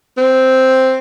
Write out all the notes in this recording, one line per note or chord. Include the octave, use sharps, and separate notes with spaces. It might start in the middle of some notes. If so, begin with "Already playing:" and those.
C4